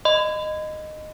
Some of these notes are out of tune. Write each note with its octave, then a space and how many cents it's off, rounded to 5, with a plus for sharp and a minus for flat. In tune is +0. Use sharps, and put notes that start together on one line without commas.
D#5 -10 B5 +40